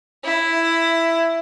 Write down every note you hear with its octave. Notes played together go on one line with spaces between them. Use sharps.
E4